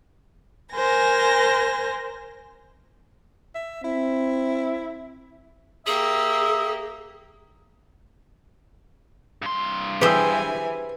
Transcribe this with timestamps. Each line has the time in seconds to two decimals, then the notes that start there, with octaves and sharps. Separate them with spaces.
0.73 A#4 C5 G#5 A#6
3.55 E5
3.84 C4 E4
5.87 A#3 G4 G#4 E5 D#6
9.42 G2 C6
10.01 E3 G4 G#4 B4 C5 G#5 E6